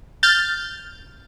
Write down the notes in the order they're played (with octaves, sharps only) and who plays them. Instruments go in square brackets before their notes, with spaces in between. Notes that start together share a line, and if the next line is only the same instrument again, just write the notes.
[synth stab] F6 G6 A6